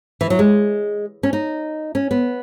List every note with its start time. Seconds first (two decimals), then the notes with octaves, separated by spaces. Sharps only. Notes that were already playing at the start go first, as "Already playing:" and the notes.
0.21 E3
0.30 F#3
0.39 G#3
1.23 C#4
1.33 D#4
1.95 C#4
2.11 B3